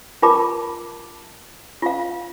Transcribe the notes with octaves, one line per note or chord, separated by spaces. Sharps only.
F4 G4 A#4 A5 B5 D6
F4 F5